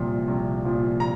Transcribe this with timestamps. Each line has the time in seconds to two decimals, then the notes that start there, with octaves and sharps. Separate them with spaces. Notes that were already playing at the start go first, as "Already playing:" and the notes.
Already playing: C2 A#2 F3
0.28 C2
0.65 A#2 F3
1.00 A#5